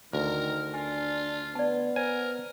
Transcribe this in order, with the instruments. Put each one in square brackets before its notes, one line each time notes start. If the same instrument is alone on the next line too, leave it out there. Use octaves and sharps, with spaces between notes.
[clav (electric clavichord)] D2 [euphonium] D#3 [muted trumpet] A#4
[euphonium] D4 [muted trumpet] F4 [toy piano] G#5
[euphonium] B3 [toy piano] D5 A5
[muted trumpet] A#4 [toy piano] C5 [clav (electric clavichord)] G#5